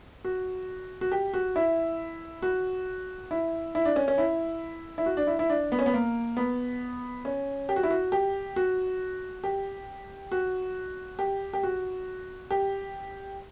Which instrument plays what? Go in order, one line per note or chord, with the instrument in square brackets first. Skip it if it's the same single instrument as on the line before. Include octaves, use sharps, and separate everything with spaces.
[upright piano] F#4
F#4
G4
F#4
E4
F#4
E4
E4
D4
C#4
C#4
E4
E4
F#4
D4
E4
E4
D4
B3
C#4
B3
A#3
B3
C#4
G4
F#4
E4
F#4
G4
F#4
G4
F#4
G4
G4
F#4
G4